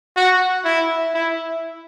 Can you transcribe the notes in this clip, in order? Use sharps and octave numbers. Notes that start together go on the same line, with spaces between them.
F#4
E4
E4